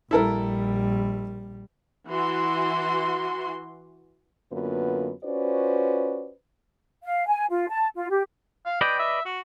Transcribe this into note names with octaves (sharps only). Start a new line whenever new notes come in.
A#1 G3 E4 A4 A#4
E3 F#4 C6
F#2 D3 A#3 B3 F4 B4
C#4 F4 F#4 B4 C5 D5
F5
G#5
F4
A5
F4
G4
F5
B4 D5 D#5 G5
E5
F#4